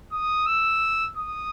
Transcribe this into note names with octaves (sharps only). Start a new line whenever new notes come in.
D#6
E6
D#6